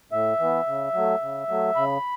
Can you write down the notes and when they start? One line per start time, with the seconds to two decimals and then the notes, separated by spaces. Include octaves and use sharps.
0.12 A2 E5
0.39 E3 B3
0.67 C#3
0.94 F#3 A3
1.22 C#3
1.49 F#3 A3
1.76 C#3 B5